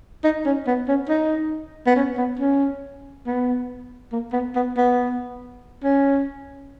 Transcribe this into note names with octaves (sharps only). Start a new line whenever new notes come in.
D#4
C#4
B3
C#4
D#4
B3
C#4
B3
C#4
B3
A#3
B3
B3
B3
C#4